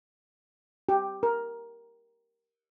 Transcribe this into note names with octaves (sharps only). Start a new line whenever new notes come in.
G4
A#4